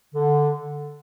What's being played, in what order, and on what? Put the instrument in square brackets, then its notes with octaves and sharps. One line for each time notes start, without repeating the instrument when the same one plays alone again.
[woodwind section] D3